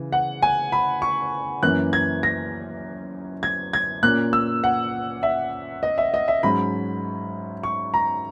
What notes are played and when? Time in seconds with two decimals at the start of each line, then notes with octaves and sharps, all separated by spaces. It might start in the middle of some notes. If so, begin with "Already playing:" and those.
Already playing: C#3 E3
0.12 F#5
0.42 G#5
0.72 B5
1.02 C#6
1.63 F#2 E3 A#3 C#4 F#6
1.93 G#6
2.23 A#6
3.43 G#6
3.73 G#6
4.02 A#2 A#3 C#4 F#6
4.33 E6
4.64 F#5
5.23 E5
5.83 D#5
5.98 E5
6.14 D#5
6.28 E5
6.43 G#2 F#3 C#4 B5
7.63 C#6
7.94 A#5